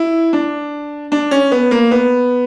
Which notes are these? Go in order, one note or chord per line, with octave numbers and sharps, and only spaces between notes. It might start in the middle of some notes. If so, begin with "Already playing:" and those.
Already playing: E4
D4
D4
C#4
B3
A#3
B3